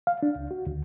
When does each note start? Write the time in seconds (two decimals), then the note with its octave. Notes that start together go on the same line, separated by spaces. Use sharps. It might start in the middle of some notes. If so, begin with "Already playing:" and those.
0.07 F5
0.23 D4
0.36 C#2
0.51 F#4
0.67 D2